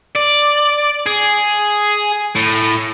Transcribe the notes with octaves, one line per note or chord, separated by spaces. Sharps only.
D5
G#4
A2